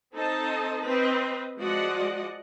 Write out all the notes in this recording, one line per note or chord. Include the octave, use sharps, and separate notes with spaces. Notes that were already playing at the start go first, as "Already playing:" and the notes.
C4 D#4 A4 C5 D#5 A5
C4 B4 C5 D#5
F3 G#3 F#4 D5 D#5 F#5